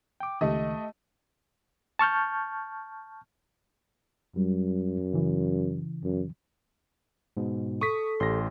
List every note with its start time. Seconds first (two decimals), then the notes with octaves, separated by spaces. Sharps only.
0.20 G5 D6
0.41 C#2 D#3 A3 G4 D#5
1.99 A5 C#6 F6 G6
4.36 F#2 F#3 G3
5.13 C#3 E3
6.04 F#2
7.37 G#2 B2
7.81 A4 C#6 D#6 B6
8.20 A1 G4 C6 A#6